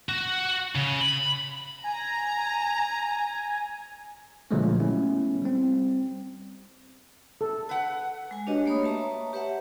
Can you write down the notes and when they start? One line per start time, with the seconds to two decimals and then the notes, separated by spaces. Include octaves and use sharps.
0.09 F#4
0.75 C#3
1.01 B5
1.84 G#5 A#5
4.51 A#2 D3 F3 F#3 G#3 A3
4.80 A3 B3 C#4 E4
5.42 G3 C4
7.41 A4
7.69 B4 F#5
8.31 G#3 G#5
8.47 D4 F#4 G4 B4 C#5 D#5
8.66 A3 A#3 C#5 B5 D#6
8.83 B4 E5 A5 A#5 C#6
9.33 G4 B4 C#5 E5 F#5